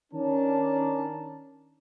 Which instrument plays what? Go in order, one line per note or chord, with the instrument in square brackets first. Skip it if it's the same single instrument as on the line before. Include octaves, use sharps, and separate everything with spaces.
[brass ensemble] D#3 C#4 D4 A#4 A5